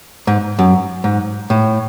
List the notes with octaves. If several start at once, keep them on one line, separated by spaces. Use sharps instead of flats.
G#2
F#2
G#2
A2